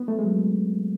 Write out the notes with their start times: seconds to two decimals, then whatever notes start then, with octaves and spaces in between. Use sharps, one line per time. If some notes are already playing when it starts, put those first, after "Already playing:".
Already playing: B3
0.08 A3
0.19 G#3
0.24 F#3